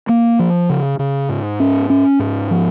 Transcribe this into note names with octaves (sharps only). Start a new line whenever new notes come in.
A#3
F3
C#3
C#3
G#2
C#4
C#4
G#2
F3